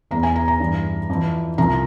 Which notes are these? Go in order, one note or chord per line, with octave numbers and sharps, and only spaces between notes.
E2 E3 A#5
G#5
A#5
A#5
G2 E3
F2 E3
C2 C3 F3 A#5